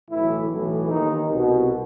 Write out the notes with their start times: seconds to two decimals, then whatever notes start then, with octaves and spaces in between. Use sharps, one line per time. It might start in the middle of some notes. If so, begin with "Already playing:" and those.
0.09 B1 A2 E3 E4
0.49 B1 A2 E3
0.89 D#2 D#3 D#4
1.29 C2 B2